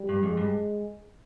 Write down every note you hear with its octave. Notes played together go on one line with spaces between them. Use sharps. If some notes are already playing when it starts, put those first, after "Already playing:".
Already playing: G3
G2
F2 G#3
G2